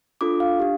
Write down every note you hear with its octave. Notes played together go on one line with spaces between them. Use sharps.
D4 F4 A4 D6
F5
D4 G4